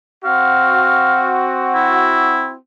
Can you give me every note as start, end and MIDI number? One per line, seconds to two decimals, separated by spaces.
0.25 2.56 60
0.25 2.56 66
0.25 1.40 77
1.75 2.52 64